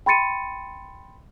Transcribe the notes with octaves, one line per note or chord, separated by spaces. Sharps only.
G5 B5 C6 A6 C#7 D#7